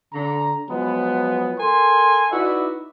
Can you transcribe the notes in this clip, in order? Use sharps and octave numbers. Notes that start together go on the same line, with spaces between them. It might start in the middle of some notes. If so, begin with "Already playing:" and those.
D3 A#5
F3 F#3 G#3 B3
A4 A#4 G#5 C6
D#4 E4 F#4 B4 D5 E5